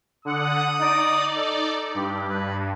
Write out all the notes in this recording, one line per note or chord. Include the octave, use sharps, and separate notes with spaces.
D3 F#5 D#6
D#4 D5
A4
G2 G4
B4